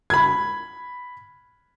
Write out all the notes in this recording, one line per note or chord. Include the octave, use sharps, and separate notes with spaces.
B5 G#6